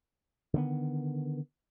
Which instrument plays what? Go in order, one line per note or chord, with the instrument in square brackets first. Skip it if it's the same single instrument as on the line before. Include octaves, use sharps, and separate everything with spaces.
[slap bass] D3 D#3 G#3 B3